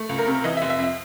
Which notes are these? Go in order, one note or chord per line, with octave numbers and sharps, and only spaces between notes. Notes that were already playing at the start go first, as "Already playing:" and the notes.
Already playing: A3
C#2
A#4
C3
E3 D#5
E5
F1
E5
F2
E5